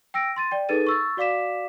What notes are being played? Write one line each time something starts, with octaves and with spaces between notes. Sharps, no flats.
G5 E6 A#6 D7
C6 A6 D#7
D5 G5
D#4 G#4 A4 B4 A6 D#7
C#6 E6 A6
F#4 D5 F5 D6 B6 E7